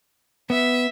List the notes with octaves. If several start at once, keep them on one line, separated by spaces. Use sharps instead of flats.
B3 E5